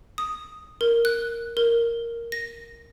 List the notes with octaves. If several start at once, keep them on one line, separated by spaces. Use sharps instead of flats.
D#6
A#4
F#6
A#4
A#6